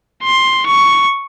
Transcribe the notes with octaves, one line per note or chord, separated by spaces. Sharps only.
C6
C#6